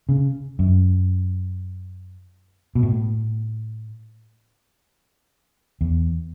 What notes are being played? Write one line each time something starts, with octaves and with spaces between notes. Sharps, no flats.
C#3
F#2
B2
A2
E2